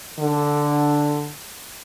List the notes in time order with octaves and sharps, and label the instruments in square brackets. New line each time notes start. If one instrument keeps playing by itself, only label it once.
[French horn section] D3